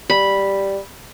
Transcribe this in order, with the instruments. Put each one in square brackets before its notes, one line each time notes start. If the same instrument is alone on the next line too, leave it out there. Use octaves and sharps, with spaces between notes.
[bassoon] G3 [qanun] B5